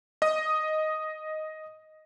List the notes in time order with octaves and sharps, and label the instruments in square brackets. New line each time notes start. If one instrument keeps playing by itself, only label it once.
[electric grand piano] D#5 D#6